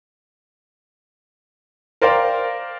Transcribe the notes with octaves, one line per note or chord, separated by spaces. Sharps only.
A#4 C5 D5 F5 G5